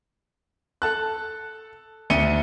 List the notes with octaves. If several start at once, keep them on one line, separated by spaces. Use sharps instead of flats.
A4 A5 F#6
D2 D4 C#7 D#7 G7